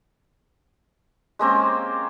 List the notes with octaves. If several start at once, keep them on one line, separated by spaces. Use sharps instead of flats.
G#3 A#3 C4 C#4